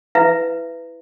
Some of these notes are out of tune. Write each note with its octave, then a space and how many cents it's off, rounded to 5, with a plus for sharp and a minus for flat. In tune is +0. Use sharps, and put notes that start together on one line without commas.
E4 -5 B4 +15 E5 +30